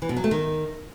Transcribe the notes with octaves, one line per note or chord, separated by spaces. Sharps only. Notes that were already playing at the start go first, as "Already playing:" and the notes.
E3
B2
F#3
A3
D#3